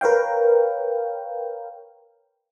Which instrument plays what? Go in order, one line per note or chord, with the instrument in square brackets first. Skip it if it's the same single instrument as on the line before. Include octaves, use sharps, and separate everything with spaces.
[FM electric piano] A#4 B4 C#5 F5 G5